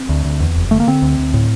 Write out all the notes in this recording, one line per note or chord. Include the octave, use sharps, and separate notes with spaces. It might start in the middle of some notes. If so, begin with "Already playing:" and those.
Already playing: C4
D2
D2
E2
F1
D3 A3
A#3
D3 C4
D2
D2
A2